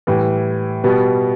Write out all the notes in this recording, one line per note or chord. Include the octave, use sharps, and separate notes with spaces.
A2 E3 G3
B2 G3 B3